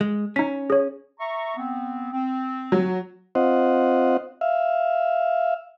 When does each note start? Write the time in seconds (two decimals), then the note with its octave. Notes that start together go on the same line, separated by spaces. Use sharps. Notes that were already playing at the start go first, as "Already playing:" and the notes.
0.01 G#3
0.36 C#4 D#4 B6
0.70 G#4 C#5
1.20 E5 A#5 C#6
1.57 B3 C4
2.12 C4
2.72 F#3
3.35 C4 F4 C5 D#5 F#5
4.41 E5 F5